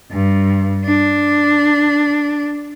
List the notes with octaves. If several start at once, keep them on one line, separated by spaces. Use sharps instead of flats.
G2
D4